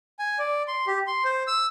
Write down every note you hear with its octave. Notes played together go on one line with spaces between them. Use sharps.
G#5
D5
C6
G4
C6
C5
E6